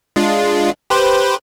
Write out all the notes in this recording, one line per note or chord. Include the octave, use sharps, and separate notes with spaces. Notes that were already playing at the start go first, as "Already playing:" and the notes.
G#3 D4 F4
G4 B4 C5